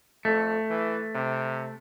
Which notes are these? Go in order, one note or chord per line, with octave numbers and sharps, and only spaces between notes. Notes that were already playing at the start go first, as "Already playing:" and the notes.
F2 A3
E3
C3